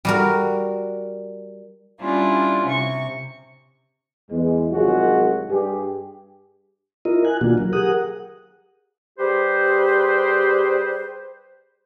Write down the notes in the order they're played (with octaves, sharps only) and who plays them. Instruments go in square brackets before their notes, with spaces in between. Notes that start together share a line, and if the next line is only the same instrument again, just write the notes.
[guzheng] G3 F#4 A#4
[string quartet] G3 C#4 D4 E4 F4
C3 C#6
[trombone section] E2 G#3
C2 D#3 F#3 G#3 F4 F#4
G2 G4 G#4
[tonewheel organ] E4 F4 A#4 D#5
G#5 F#6
B2 D#3 A#3 D4 F4 F#4
F#3 A#4
G4 G#4 A#4 F#5 D#6 F#6
[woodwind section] G3 G4 G#4 B4 C5